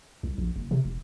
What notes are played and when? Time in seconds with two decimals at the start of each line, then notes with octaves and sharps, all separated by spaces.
0.23 C2
0.38 A#1
0.56 F#1
0.71 C3
0.85 E1